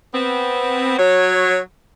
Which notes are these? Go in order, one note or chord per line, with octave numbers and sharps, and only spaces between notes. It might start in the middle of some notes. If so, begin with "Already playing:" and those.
B3 C4
F#3 C#5